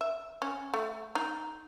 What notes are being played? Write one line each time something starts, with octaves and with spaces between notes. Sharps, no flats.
E5
C#4
A3
D#4